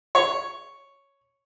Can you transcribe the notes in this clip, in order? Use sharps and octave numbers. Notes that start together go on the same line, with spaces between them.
C#5